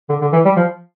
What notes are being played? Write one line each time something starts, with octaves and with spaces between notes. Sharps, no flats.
D3
D3
E3
G3
F3